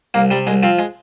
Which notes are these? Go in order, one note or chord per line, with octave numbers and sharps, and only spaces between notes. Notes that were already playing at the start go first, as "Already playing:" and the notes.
C2 A#3
C3 G3
C2 G#3
F3 C4
G#3